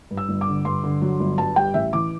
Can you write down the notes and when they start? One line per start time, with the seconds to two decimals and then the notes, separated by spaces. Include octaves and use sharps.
0.11 G2
0.17 E6
0.29 G1
0.41 D6
0.47 D3
0.65 G2 C6
0.84 D3
1.01 F#3
1.20 G1
1.38 G2 A5
1.56 G3 G5
1.74 A1 E5
1.93 E3 D6